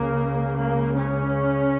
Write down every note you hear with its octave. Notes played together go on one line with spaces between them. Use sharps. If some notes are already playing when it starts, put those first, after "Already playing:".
Already playing: C#2 C#3 A#3
A#3
C#4